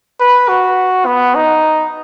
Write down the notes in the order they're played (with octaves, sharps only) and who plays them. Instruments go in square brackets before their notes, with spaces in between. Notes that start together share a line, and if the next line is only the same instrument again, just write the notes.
[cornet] B4
F#4
B3
D#4